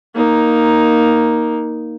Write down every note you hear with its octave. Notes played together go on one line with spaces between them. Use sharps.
A#3 D#4